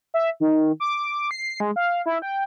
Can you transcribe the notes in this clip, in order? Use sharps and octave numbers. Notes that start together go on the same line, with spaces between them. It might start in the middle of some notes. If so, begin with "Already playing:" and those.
E5
D#3
D6
C7
G#3
F5
E4
G5